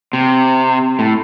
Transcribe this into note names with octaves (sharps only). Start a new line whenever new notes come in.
C3
A2